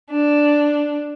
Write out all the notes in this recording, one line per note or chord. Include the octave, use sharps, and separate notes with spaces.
D4